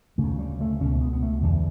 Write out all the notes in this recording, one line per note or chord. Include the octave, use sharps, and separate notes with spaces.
D2 C#3 A3
G3
A3
C#2 B2 C#4
B3
B3
A3
E2 D3 G3